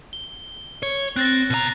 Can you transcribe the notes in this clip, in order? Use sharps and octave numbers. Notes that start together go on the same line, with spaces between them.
G7
C#5
C4 F#6 A6 A#6
B2 A#5